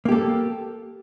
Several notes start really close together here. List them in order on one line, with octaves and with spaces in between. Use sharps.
A#3 G4 A4